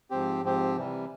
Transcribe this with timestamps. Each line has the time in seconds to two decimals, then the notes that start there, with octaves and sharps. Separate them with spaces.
0.11 G#2 F3 C4 G4
0.43 G#2 F3 C4 G4
0.76 C3 E3 G3